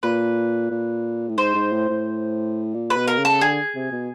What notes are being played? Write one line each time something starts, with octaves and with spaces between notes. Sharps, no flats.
A#2 B4
A#2
A2
G#2 C5
G#2
A2
A2
A#2
B4
B2
A#4
C#3
A4
D3 G#4
C3
B2